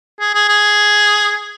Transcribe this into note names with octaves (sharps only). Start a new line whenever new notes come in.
G#4
G#4
G#4